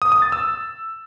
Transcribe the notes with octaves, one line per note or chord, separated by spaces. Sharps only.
D#6
D#6
A6
E6